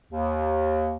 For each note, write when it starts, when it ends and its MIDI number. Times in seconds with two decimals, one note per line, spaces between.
0.12 0.96 39